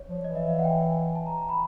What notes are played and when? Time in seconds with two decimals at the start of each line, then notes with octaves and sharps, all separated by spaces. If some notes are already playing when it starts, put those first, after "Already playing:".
Already playing: C#5
0.09 F3
0.20 D5
0.24 E3 D#5
0.35 E5
0.47 F5
0.59 F#5
0.64 G5
0.70 G#5
1.15 A5
1.26 A#5
1.38 A#5
1.49 B5